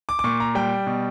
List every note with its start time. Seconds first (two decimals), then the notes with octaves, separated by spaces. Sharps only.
0.09 D6
0.19 D6
0.24 A#2 C#6
0.40 A#5
0.55 G3 G5
0.87 B2